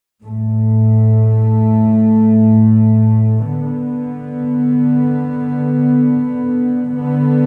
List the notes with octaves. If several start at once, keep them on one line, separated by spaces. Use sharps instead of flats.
A2 A3
D3 B3
B3
D3